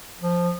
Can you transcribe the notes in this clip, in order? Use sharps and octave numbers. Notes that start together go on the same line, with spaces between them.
F3